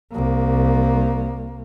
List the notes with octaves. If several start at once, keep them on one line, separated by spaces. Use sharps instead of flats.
C2 A#3